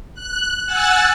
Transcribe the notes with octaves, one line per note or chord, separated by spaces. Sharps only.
F#6
F#5 G#5 E6 F#6 A6